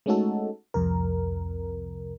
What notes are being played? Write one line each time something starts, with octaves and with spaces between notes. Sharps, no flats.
G#3 A3 C#4 D#4 F#4 A4
C2 F2 C3 A#4